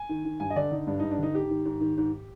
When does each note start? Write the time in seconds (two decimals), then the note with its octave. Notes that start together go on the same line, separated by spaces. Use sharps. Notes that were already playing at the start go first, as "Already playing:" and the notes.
Already playing: G#5
0.09 D#3
0.25 D#3
0.40 G2 G#5
0.50 D#5
0.56 D3 D5
0.71 D3 D#4
0.87 G2 D4
0.99 G2 D#4
1.11 D4
1.18 D3 D#4
1.34 G#2 G4
1.50 D#3
1.65 G#2
1.81 D#3
1.97 G#2